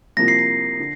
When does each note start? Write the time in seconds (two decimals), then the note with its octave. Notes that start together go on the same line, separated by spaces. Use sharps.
0.17 C2 C3 F3 A#3 A#6
0.28 C7
0.39 A#6
0.79 D3